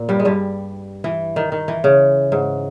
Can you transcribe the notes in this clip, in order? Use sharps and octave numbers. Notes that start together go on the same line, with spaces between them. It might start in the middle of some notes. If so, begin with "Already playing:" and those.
Already playing: A#2
G2 G3
G#3
G2 G3
E3
D#3
D#3
E3
C#3
G#2